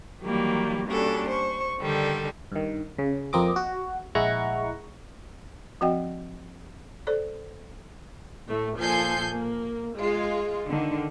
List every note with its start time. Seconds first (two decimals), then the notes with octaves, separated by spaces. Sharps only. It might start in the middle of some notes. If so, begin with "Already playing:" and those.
0.22 D#3 E3 F#3 G3 A#3
0.87 G3 A#3 C#4 D4 F#4 A4
1.28 C5 C#6
1.80 D3 D#3 G3 A4
2.52 G2 D#3
2.98 C#3
3.33 F2 A#3 C4 D#5 D6
3.56 F#4
4.15 A#1 G#3 E4 F#5 A#5 C#6
5.81 F3 C4 F#4 D#5 F#5 G5
7.07 A4 C5 D5
8.48 A2 A3
8.78 A#2 F3 A4 G#5 G6 C7
9.32 A#3
9.96 G#3 F4
10.68 D3 D#3